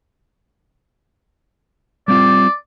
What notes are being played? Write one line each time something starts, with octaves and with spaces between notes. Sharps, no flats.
G3 C4 F4 D5